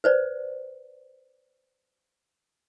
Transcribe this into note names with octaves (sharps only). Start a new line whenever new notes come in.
B4 C5 D5